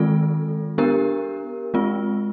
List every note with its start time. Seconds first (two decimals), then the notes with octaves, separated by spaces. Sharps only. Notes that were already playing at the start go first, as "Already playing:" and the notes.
Already playing: D#3 G#3 C4 F4 A4
0.78 B3 D4 G4 A#4
1.74 G#3 C4 F4